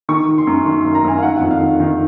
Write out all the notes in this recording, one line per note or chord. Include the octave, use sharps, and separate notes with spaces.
D#3 C#6
D#3
C6
F#2
D#3 C6
C6
F#2
A#5
F#2 G#5
F5
D#3 F#5
F#5
F2
F5
D#3
D#3